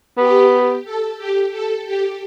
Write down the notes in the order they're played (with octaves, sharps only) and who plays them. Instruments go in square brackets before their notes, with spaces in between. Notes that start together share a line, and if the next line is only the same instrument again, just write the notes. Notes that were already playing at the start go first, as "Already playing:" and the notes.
[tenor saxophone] B3 [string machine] G4
[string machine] A4
G4
A4
G4